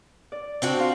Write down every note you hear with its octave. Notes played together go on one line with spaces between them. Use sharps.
D5
C4 D4 F#4
F4 F5